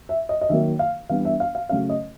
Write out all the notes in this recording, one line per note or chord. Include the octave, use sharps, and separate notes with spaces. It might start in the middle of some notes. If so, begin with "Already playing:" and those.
E5
D#5
D#5
D#3 F#3 A#3 E5
F5
E3 G3 B3 D4 F5
E5
F5
F5
C#3 F#3 A3 C#4 F5
D#5